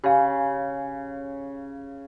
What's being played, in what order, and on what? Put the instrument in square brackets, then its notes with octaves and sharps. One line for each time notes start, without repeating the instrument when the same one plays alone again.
[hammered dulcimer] C#3 [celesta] G4 F5 G#5